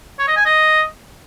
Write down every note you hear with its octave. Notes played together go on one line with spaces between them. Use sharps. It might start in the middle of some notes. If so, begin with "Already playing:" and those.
C#5
D#5
G#5
D#5